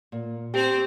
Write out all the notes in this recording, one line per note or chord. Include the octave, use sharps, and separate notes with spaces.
A#2
C4 G4 C5 G5 A5